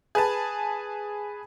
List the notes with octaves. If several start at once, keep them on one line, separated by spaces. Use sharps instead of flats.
G#4 B4 A5